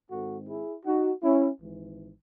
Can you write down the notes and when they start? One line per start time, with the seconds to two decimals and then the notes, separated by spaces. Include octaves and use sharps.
0.11 G#2 D#3 G#3 C4 F#4 A4
0.48 E4 G#4
0.85 D#4 F#4
1.23 C#4 E4
1.61 G#1 G#2 E3